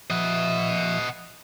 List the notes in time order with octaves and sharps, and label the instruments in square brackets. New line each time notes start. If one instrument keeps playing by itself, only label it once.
[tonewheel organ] F3 E5 [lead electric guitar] D#5 F#5